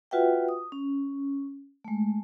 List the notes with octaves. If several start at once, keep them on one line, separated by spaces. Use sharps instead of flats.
F4 F#4 B4 E5 F#5 G5
D#6
C#4
G#3 A3